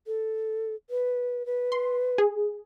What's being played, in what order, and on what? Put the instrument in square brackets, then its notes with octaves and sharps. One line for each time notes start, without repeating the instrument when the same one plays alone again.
[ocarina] A4
B4
B4
[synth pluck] C6
G#4